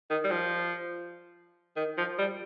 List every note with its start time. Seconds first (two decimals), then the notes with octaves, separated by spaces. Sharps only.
0.10 D#3
0.24 G3
0.31 F3
1.77 D#3
1.97 F3
2.18 G3